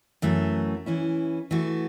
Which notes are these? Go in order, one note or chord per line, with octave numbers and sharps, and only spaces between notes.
F#2 E3 A3 F#4
E3 C#4 E4
E3 A3 F#4